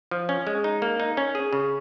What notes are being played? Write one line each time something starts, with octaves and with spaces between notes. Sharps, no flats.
F3
C#4
G#3
D#4
A#3
D#4
C#4
G#4
C#3